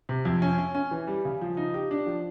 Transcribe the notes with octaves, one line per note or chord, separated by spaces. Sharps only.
C3
F2
C#4
C#4
C#4
E3
G3
C#3
F3
D#4
G4
D4
F3